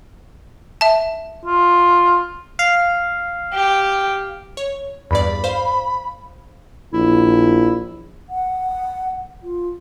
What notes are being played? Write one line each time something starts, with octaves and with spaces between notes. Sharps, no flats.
E5 A5
F4
F5
G4
C#5
E2 G2 D5 B5
C5 F5
A#1 E4
F#5
F4